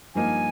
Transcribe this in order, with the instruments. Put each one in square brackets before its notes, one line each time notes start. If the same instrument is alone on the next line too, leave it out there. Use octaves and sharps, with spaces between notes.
[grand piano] G2 F3 A#3 D#4 [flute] G#5